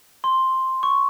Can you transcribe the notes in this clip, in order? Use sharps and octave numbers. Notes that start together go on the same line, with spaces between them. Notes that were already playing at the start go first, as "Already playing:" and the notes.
C6
C#6